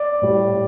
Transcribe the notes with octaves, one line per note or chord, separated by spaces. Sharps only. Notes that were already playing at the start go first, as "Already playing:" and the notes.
Already playing: D5
A2 G3